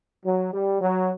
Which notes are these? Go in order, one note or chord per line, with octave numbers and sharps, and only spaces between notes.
F#3
G3
F#3